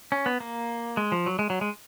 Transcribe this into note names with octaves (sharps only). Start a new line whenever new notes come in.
C#4
B3
A#3
G#3
F3
F#3
G#3
F#3
G#3